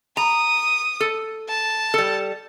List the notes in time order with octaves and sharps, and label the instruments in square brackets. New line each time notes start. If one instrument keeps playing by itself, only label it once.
[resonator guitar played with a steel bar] A#5 [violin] D#6
[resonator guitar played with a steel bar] A4
[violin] A5
[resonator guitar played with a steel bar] G3 A4